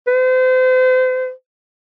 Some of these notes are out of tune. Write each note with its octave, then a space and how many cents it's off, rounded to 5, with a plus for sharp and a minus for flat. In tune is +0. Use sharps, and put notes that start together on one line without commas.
C5 -35